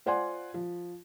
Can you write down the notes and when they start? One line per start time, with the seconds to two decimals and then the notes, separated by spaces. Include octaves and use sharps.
0.06 F4 C5 D5 F#5 G#5 C6
0.54 F3